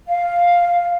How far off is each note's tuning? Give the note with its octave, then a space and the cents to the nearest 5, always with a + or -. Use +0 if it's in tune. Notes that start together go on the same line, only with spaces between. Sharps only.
F5 +0